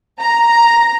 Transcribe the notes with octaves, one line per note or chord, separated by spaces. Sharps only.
A#5